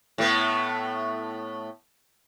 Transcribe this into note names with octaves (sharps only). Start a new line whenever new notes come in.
A2 A3 B3